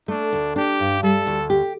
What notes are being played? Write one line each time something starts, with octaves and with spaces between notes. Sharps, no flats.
A3 D4
D2
D4 G4
G2
G3 A4
D2
G4